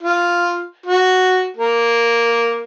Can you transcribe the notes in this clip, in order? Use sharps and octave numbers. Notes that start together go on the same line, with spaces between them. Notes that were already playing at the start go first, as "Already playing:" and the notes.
F4
F#4
A#3